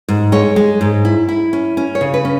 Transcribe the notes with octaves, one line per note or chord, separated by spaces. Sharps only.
G#2
G#3 C#5
G#3
G#2
E4
E4
C#4
C#4
C#5
C#3
B4
C#4